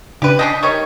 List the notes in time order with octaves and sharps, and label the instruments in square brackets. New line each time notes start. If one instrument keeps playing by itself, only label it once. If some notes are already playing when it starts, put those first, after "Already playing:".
[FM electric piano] C#3 D4 [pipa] G4 B4
[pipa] C#4 D4 D#5 [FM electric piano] G6 B6 C7
[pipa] G3 D#4 C#5 [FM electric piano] A#4 D#5 C#6